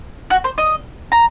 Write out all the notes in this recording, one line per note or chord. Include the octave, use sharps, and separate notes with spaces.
F#4
C5
D#5
A#5